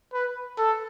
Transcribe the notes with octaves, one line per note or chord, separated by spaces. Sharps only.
B4
A4